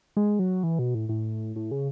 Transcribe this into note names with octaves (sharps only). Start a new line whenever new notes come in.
G#3
F#3
E3
B2
A2
A2
A2
C#3